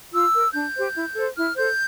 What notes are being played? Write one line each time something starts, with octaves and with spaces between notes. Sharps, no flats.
F4 E6
A#4
D4 G6
G4 C5
E4
A4 C5
E4 F6
A4 C5 G6